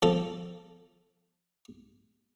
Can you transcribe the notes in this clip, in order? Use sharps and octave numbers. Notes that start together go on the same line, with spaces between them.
F3 A4